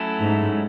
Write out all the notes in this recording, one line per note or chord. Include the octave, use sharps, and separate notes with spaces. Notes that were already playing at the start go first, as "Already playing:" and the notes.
Already playing: F#3 A3 C#4 E4 A4
G#2